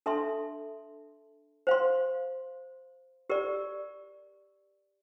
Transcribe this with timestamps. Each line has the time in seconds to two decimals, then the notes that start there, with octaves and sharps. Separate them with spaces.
0.06 D4 A4 E5 A5 C6
1.67 C5 F5 C6
3.30 G4 A#4 D5